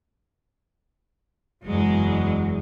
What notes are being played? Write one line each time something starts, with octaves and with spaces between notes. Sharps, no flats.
F#1 E2 F#3 G#3